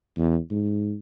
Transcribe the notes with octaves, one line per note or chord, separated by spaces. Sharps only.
E2
G#2